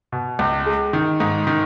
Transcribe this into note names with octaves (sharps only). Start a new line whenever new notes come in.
B2
C#2
G#3
D#3
G#2
D#3